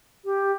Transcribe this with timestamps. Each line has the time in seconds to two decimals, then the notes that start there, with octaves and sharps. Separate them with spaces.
0.25 G4